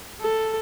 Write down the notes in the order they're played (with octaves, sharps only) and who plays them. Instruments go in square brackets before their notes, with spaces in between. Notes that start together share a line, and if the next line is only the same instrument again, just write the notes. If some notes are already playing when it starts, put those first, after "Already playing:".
[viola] A4